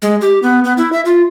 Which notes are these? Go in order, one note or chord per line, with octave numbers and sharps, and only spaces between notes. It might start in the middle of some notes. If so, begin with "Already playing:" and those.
G#3
G4
B3
B3
E4
E5
F4